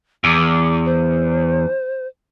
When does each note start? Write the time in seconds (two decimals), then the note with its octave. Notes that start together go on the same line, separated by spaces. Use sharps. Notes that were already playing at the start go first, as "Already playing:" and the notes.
0.24 E2 D6
0.85 C5